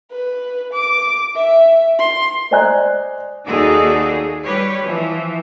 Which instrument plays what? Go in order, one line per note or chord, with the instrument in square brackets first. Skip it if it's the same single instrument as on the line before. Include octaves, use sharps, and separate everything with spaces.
[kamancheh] B4
D6
E5
C6
[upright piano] C5 D5 D#5 G#5 A#5 F#6
[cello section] D#2 D#4 F#4 G#4 A4 D5
G3 G4 B4 C#5
E3 F3